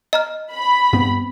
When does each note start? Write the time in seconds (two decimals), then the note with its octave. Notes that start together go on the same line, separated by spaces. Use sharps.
0.13 D#5 A#5 F6
0.54 B5
0.92 G2 B3 C4